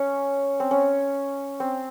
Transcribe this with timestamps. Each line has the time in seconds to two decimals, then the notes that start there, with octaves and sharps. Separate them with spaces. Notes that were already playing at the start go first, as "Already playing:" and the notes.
Already playing: C#4
0.60 C4
0.71 C#4
1.60 C4